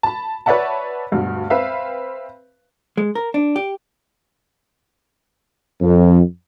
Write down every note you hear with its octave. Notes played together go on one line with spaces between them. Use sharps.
A5 B5
B4 C#5 D5 E5 F#5 A5
D2 G2 B2
C4 B4 E5 F5
G#3
A#4
D4
G4
F2